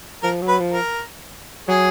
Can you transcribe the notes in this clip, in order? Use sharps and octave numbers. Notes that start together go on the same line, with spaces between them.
F3 A#4
F#3
B4
F3
A#4
F#3 G#4